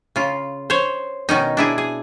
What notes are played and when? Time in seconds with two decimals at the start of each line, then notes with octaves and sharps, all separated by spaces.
0.16 C#3 F4
0.70 C5 C#5
1.29 B2 D#3 C#4 D#4
1.57 D4 E4 G#4
1.78 G#4